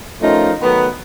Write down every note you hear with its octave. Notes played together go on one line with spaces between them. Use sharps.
F3 A3 C#4 D#4 F4 A#4
D#3 F#3 A3 B3